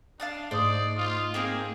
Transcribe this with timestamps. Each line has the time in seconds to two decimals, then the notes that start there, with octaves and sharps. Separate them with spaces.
0.20 D4 F5 A5 D#6
0.51 G#2 A3 C5 D5 D#6
0.97 F4
1.34 A#3 C4 G#4 A#4